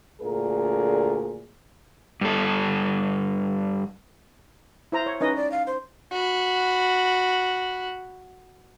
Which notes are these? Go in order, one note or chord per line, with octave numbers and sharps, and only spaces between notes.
D2 A#2 D3 G#4 A#4
G2 A4
E4 C5 A#5
C#5
C#4 D#4 B4 D#5
D5
F5
C5
F#4 B5